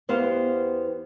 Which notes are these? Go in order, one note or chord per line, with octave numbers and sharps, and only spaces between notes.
E2 B3 G4 C5 F5